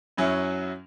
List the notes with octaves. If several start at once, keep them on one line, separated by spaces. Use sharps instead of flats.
F#2 F#3 C#4 E4